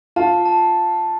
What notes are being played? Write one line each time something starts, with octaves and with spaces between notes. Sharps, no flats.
F4 A5
A5